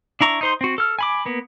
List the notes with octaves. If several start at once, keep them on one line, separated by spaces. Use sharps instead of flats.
D4 E4 A#5 C#6
D#4 C5 C6
C4 F#4
A4 F6
G#5 B5 D6
A#3 B3